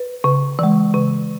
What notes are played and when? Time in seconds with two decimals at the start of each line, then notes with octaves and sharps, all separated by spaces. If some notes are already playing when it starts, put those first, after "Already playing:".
Already playing: B4
0.24 C#3
0.59 E3 G#3
0.94 C#3